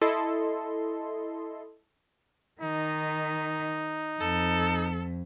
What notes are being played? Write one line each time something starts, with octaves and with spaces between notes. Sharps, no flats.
E4 A4 D#5 C6
D#3 D#4
F2 A4